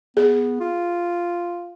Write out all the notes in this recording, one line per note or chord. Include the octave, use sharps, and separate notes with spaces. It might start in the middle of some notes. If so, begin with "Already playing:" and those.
B3 G#4
F4